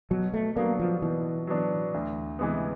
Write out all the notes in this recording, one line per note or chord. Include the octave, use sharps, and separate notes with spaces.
B2 F#3
A3
F#3 A#3 B3 D4
F3
B2 E3
F#3 B3 D4
D2
C3 E3 G#3 B3